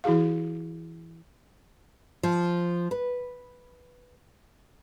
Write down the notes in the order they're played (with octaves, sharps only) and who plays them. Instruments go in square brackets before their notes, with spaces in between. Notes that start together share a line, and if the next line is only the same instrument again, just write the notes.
[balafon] E3 E4 F#4 G#4 F5
[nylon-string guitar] F3
B4